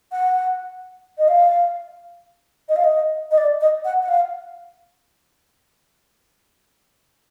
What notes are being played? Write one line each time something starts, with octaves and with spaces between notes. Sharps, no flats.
F#5
D#5
F5
D#5
F5
D#5
D#5
D5
D#5
F#5
F#5
F5